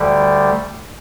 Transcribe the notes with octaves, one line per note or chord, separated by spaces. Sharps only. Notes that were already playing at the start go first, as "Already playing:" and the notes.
Already playing: D2 D3 G3